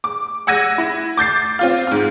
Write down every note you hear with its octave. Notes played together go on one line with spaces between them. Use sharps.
D6
F#5 E6 G#6 A#6 D#7
E4
D6 G6 A6 C7
C4 F4 F5
G#2 F6